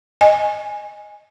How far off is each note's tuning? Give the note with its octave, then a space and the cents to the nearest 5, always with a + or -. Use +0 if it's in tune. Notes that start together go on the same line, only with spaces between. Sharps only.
D#5 +0 G#5 -5